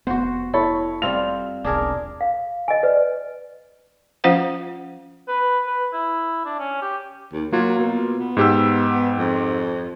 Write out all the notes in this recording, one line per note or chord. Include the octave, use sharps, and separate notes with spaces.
F1 B3 F#4 C5 F#5
E4 A4 C#5 B5
G3 C4 F4 F7
E1 B1 D4 G#4 A#4
F5
D#5 G#5
B4 D5
F3 C#4 F4 C5 F5 F#5
B4
B4
E4
D4
C#4
G4
D#2
F#3 A#3 F4
B2
B3
G#2 G4 E6
F2